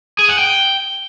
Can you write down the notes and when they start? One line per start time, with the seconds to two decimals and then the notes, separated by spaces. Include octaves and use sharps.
0.19 G#4
0.29 F#5
0.39 G5